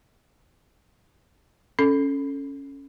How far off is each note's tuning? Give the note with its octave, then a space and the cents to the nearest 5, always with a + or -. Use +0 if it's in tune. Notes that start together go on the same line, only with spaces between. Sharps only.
C#4 +0 A4 +0